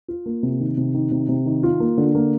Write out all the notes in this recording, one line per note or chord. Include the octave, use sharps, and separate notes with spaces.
F4
A#3
C3
D#3
C3
D#3
C3
C3
D#3
F4
A#3
D3
A#3